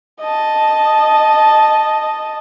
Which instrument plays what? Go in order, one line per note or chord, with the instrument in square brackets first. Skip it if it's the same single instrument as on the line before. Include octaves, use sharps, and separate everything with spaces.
[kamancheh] D#5 A5